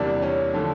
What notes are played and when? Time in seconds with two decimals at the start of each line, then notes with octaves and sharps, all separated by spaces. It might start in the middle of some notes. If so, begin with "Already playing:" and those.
Already playing: E2 C3 E3 G3 A#3 D4
0.22 C#4
0.54 D3 F3 A3